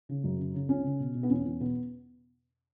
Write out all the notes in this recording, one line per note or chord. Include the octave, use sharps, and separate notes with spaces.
C#3
F#2
C#3
C#3
C#2 C#4
C#3
B2
B2
B3
E2 C#4
E2
B2 B3